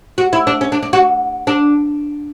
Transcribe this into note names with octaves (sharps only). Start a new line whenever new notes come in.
F#4
E4
D4
C#4
D4
D4
F#4
D4